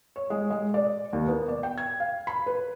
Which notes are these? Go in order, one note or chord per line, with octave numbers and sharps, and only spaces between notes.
C#5
G#3
G#3
D5
D#2
B3
D5
G5
G#6
F5
B5
B4